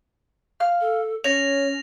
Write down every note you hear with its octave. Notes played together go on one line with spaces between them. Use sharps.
F5 F6
A4
C#4 C#5 A#6 F7